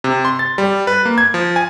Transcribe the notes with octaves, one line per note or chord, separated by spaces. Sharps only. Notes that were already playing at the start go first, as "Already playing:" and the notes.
C3
C6
A6
G3
B4
A#3
G#6
F3
G#5